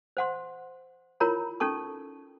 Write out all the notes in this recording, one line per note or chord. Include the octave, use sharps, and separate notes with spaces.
C5 F#5 C6
E4 F4 A#4 C#5 A#5 B5
C#4 D#4 A4 A5 C#6